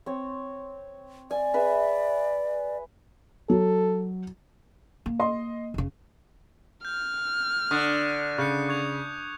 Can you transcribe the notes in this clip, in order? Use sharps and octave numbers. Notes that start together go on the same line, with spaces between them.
C4 C#5
D5 G#5
G#4 B4 E5
F#3 A4
A#3
D#5 C6
F1 C#3
F6 G6
D3 C#6 D#6 F#6
C#3 C#6 G6 C#7
C#6 G#6 F7